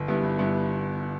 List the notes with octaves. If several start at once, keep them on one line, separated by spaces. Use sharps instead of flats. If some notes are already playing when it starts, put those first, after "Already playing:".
Already playing: G1
G2 G3 B3 E4
G1
G2 G3 B3 E4